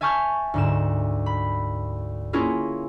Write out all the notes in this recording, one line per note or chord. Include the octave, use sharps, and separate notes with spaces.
E5 G#5 A5 C#6 F6 G6
D2 G#2 E7
B5
A#3 C#4 E4 F4 G#4 A#4